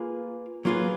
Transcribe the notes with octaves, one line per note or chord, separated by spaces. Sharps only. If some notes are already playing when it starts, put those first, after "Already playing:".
Already playing: A#3 F4 G#4 B4
F#3 A#3 F4 G#4 B4